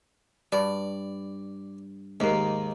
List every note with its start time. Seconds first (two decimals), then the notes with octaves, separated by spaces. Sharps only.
0.52 G2 D5
2.20 D#2 G#2 A#3